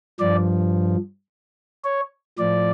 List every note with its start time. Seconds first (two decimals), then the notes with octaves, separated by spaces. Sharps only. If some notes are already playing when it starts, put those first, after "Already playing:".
0.20 G2 F3 D5
1.84 C#5
2.39 A2 F3 D5